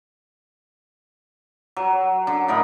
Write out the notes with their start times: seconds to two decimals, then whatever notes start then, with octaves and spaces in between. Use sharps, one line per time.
1.76 F#3
2.27 D3
2.48 A2 A#4 D#5 B5